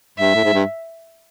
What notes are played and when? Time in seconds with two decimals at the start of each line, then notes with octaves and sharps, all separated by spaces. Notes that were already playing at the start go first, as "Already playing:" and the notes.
0.18 G2 E5
0.35 A2
0.44 G#2
0.54 G2